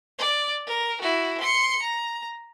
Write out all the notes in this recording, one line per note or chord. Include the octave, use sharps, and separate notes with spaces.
D5
A#4
E4 F#4
C6 C#7
A#5